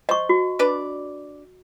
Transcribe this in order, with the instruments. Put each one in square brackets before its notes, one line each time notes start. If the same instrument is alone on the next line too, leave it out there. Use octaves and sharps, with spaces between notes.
[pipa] C5 [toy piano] D#5 C#6
[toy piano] F#4
[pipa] D4 B4 D5